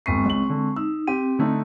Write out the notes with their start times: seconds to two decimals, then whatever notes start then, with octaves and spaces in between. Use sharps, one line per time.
0.06 G1 G#3 C4 C#6 C7
0.26 C#2 F#7
0.50 D3
0.76 D#4 E6
1.08 C4 G4
1.39 D3 A3 D#4